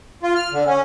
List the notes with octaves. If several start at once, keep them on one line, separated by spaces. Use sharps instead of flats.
F4
F6
D3
C#4